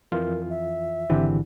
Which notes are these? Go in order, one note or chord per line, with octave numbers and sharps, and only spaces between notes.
F2 E3 F4 A#4
E5
G#1 D3 E3 C4 G4